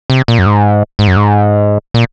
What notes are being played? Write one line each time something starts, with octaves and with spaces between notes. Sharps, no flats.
C3
A#2
F#2
G#2
G#2
F#2
G#2
A#2